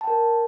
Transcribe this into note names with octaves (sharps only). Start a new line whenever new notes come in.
A#4 G5 A5